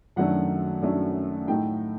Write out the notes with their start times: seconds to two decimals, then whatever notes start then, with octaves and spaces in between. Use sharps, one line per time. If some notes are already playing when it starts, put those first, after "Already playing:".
0.16 F#2 D#3 F#3 A3 D4 F#5
0.82 F#2 D#3 F#3 A3 D4
1.48 A2 A3 D#4 G5